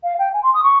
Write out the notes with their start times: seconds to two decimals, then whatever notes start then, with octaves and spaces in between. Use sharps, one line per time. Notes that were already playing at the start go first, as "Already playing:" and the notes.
0.04 F5
0.19 G5
0.34 G#5
0.43 C6
0.54 D#6
0.63 C#6